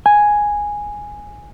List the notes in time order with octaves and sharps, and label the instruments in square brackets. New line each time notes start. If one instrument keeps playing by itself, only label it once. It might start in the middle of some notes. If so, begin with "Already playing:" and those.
[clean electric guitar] G#5